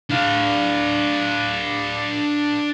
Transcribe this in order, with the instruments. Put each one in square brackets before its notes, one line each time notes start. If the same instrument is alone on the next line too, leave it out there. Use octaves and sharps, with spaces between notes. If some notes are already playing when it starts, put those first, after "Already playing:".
[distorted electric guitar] D4 F5